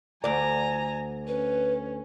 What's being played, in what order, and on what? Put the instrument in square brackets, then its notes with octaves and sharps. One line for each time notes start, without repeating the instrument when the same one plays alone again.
[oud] D2 D5 [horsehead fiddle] G#5 A#5
[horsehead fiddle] C#4 [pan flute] B4